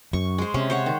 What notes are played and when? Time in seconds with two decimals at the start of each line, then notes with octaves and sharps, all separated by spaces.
0.13 F#2 C#6
0.38 G#3 C5
0.54 C3 C#4
0.70 C5 C#5 F#5
0.86 D#3